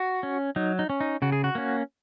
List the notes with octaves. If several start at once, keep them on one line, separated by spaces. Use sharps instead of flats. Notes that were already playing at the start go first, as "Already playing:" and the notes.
Already playing: F#4
C#4
F#3 D#4
D#4
C#4
D#4
C#3 F#4
G#4
F#4
A#3 C#4